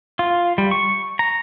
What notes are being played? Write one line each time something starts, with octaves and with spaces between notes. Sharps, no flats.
F4
G3
C#6
A#5